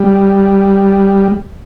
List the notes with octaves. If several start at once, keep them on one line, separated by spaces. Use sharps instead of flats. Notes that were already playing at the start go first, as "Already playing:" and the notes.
Already playing: G3